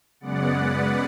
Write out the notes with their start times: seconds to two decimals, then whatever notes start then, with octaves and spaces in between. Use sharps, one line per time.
0.20 F#2 C#3 G#3 B3 D5 F#5
0.57 B4 D5